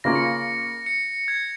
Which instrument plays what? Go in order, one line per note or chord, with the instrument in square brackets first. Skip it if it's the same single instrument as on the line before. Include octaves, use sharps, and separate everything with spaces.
[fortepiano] C#3 A#3 F4 [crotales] A#6
[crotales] C#7
A#6
C#7
G#6